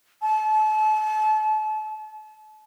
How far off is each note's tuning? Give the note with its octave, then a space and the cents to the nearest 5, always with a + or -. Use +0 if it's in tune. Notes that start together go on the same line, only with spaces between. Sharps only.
A5 -35